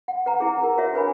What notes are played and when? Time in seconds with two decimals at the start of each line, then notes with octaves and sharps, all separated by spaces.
0.08 F#5
0.26 B4 F#5 A#5
0.40 E4 G#4
0.63 A#4
0.78 F#4 C#5 E5
0.93 D4 A#4 B4 C#5 G#5 B5